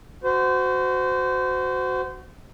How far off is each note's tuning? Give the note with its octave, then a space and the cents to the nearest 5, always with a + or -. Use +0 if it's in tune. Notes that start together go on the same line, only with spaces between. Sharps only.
F#4 +0 C5 -30